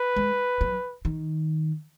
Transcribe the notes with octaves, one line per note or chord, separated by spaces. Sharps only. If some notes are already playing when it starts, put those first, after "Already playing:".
Already playing: B4
G#3
F#3
D#3